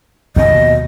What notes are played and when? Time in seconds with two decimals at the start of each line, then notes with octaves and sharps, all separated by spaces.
0.36 D#2 B2 D#5